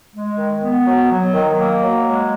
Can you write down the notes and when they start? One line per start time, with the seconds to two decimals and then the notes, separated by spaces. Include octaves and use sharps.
0.15 G#3
0.38 D#3
0.62 B3
0.86 F#3
1.11 F#3
1.34 D#3
1.59 A#3
1.82 F#3
2.06 G#3